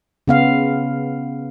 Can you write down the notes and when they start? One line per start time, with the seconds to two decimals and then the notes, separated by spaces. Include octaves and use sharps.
0.28 C#3 B3 F5